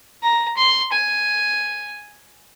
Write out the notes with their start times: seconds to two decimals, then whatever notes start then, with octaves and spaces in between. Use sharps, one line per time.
0.23 A#5
0.57 C6
0.93 G#5